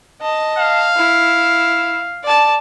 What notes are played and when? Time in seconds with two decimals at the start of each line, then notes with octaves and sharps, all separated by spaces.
0.21 D#5 A5
0.59 F5
0.97 E4
2.24 D5 A5